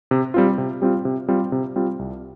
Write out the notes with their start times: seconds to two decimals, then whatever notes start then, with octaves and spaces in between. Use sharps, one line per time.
0.11 C3
0.34 G3 C4 F4
0.58 C3
0.82 G3 C4 F4
1.05 C3
1.29 G3 C4 F4
1.52 C3
1.76 G3 C4 F4
1.99 C2